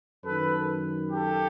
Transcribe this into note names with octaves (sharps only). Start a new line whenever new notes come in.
F#2 D#3 A4 B4
G4 A4